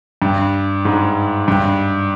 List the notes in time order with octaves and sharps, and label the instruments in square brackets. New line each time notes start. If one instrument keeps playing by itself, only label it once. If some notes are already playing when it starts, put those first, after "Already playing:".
[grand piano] G2
G#2
G2